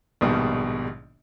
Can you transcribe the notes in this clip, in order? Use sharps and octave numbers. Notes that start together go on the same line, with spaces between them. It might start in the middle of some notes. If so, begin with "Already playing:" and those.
A#1 G#2 B2 D#3 G3